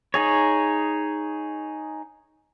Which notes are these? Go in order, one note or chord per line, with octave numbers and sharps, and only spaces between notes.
D#4 G#4 C#5